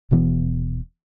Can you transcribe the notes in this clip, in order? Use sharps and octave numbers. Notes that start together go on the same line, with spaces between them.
D#1 B2 E3 B3